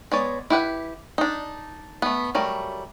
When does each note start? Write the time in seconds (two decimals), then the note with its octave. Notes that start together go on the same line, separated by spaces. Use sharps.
0.12 G#3 B3 C#5 D5
0.50 E4 G4 B4 F#5
1.18 D4 D#4
2.02 A3 B3
2.35 F#3 G3 A3 A#4